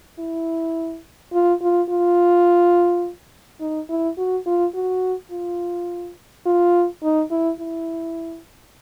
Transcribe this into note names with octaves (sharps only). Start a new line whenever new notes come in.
E4
F4
F4
F4
D#4
E4
F#4
F4
F#4
F4
F4
D#4
E4
E4